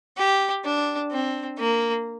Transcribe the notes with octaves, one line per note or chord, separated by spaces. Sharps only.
G4
D4
C4
A#3